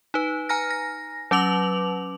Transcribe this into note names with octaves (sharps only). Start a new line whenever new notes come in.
D#4 B4
G#5 A#5 F6 A#6
A#6
F#3 C#4 B4 D6 F7 F#7